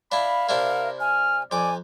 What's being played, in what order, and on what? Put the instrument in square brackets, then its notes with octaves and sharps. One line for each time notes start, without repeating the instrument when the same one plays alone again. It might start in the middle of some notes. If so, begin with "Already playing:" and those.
[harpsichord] D4 E4 [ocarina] F5 [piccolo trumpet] B5
[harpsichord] C3 D4 E4 [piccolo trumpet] A#4
[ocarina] G#5 [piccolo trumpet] F6
[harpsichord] F2 D6 [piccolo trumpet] D5 [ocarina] G#5